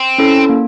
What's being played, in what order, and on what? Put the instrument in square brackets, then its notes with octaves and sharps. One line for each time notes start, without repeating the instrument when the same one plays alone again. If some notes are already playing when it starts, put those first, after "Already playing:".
Already playing: [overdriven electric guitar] C4
[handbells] C#4 E4 A4
A#3